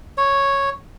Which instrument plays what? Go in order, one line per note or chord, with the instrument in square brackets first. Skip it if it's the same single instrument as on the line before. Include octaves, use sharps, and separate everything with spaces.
[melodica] C#5